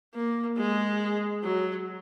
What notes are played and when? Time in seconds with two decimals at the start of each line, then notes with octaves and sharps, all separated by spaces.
0.15 A#3
0.58 G#3
1.43 F#3